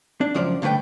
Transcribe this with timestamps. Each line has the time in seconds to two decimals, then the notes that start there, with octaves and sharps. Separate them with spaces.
0.21 D4
0.34 C#2 F#2 F3 D5
0.62 G2 D3 A3 B4 G5